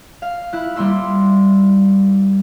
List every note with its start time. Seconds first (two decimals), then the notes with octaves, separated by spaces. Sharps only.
0.22 F5
0.53 E4 F#6
0.76 G3 A#3 E4 C6 E6